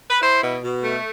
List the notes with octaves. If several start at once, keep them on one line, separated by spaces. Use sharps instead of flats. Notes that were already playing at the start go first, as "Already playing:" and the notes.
B4
E4 C5
B2
B2
A3